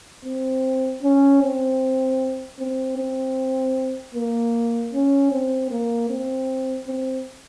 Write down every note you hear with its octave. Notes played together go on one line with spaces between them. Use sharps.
C4
C#4
C4
C4
C4
A#3
C#4
C4
A#3
C4
C4